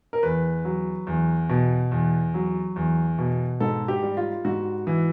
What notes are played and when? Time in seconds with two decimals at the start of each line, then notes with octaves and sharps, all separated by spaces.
0.13 A#4
0.23 E2 B4
0.65 F#3
1.07 E2
1.49 B2
1.92 E2
2.34 F#3
2.76 E2
3.18 B2
3.60 G#2 A4
3.88 G4
4.03 G3
4.17 F4
4.45 G#2 F#4
4.87 E3